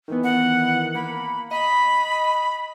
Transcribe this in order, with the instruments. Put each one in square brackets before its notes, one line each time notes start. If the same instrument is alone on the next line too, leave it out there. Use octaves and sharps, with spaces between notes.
[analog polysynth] D#3 E3 B3
[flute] F#5
[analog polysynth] A#3 [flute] B5
[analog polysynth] D#5 [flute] B5